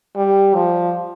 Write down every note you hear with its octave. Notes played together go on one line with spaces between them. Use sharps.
G3
F3